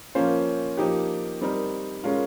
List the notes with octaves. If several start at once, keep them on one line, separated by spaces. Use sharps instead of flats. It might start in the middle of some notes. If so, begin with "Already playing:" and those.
F3 A#3 C#4 F4 C5
F3 A#3 D#4 G4
G3 C4 D#4 A#4
G#3 C#4 F4 A#4